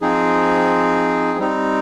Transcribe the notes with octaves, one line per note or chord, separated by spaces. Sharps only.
F3 C4 D#4 G#4
G3 C4 D#4